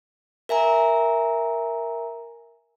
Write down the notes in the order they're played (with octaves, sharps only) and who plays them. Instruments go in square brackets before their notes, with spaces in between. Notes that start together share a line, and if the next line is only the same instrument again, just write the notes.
[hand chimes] A#4 E5 G#5 A#5